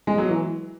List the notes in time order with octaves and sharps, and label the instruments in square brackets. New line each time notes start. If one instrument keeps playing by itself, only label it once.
[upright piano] G#3
F#3
E3